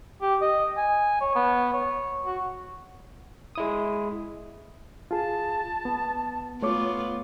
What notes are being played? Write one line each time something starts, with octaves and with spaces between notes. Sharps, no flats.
G4
D#5
G#5
C#5
B3
C#5
F#4
G#3 E4 D#6
F4 G#4 A5
B3
A3 B3 F4 C#5 D6